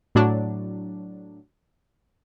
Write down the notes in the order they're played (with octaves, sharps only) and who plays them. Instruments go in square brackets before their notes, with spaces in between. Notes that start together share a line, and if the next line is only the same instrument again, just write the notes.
[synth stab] A2 F#3 D4